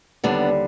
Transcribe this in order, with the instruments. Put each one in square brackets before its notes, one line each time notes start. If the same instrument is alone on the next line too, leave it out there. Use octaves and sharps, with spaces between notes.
[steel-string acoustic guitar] D#2 D3 G3 B3 D4